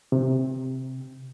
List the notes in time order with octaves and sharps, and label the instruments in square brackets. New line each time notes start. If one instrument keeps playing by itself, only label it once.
[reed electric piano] C3